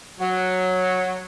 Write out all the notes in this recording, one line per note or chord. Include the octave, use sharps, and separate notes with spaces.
F#3